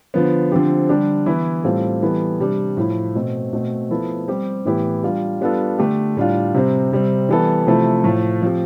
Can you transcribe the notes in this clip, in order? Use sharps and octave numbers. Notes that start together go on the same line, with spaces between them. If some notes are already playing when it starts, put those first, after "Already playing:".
D3 F3 B3
D3 F3 C4 G4
D3 G3 D4 G4
E3 B3 E4
A2 G3 C4 F4 A4
E3 G3 B3 E4 A4
C3 G3 D4 G4
A2 F3 A3 E4
B2 A3 C4
B2 A3 C4
F3 B3 E4 A4
G3 C4 G4
A2 E3 B3 E4 G4
G3 D4 F4
G3 B3 D4 F4 A4
D3 A3 D4 G4
A2 G3 D4 F4
C3 G3 C4
C3 G3 C4
E3 G3 B3 E4 A4
C3 F3 A3 E4 A4
A2 F3 A3
F3 C4 G4